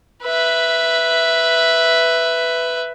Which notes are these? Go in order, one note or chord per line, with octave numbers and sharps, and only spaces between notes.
B4 E5